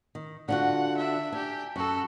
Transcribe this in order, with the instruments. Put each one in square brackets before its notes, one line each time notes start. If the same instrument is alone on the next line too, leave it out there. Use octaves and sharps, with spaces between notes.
[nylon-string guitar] D#3
[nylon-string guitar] D3 F4 F#4 [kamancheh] F#5
[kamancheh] D4 E5
[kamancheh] D4 G4 [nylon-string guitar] G#5
[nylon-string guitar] F#2 [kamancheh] F#4 A4